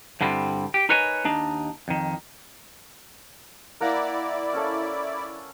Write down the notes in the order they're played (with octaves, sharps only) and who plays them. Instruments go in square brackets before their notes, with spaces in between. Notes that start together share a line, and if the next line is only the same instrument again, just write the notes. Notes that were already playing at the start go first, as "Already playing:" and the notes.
[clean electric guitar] G2 D3 G3 C4 E4
G4
D#4 A#4 B4 C#5 D#5 G#5
D#2 D4 D#4
F2 D#3
[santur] A#3 F#5 A#5 [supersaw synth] E4 D5
[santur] C#4 A4